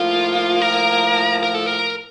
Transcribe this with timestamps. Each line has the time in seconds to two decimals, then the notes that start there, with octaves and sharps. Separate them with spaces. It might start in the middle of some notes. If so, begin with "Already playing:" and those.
Already playing: A2 F3 A#3 F4
0.62 A#4
1.43 A#4
1.55 A4
1.66 A#4